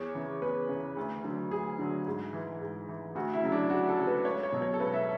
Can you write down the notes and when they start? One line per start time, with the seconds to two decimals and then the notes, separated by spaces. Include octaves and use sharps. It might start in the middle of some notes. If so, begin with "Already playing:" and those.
Already playing: E2 C#5
0.14 C#3 E3
0.42 E2 B4
0.69 C#3
0.74 E3
0.97 D2
1.24 D3 F#3
1.51 D2 G#4
1.79 D3 F#3
2.07 G#2
2.33 E3
2.61 G#2
2.89 E3
3.15 D2 F#4
3.34 E4
3.43 C#3 F#3
3.52 D4
3.70 D2 F#4
3.89 A4
3.98 C#3 F#3
4.07 B4
4.25 C#2 C#5
4.43 C#5
4.52 B2 F#3
4.62 C#5
4.74 A4
4.80 C#2 B4
4.94 E5